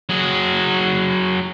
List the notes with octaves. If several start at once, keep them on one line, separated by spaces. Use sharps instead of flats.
F#3 G#4